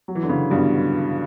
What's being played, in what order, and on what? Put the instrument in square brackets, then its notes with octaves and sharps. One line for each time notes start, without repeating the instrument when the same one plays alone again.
[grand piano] F#3
E3
D3
C#3 E3
G2 B2